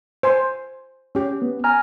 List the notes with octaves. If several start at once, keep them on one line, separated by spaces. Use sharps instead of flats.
C5 G#5 C6
C#4 G4
B3
G#5 A#5 F6